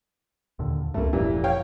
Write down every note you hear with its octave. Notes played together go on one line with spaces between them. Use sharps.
D#2 A#2 D3
C#2 G2 A3 A#3
F1 F2 A#2 E3 G3
C#5 F5 G5